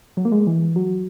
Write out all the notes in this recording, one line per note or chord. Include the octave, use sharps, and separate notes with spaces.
F#3
A#3
G#3
E3
F#3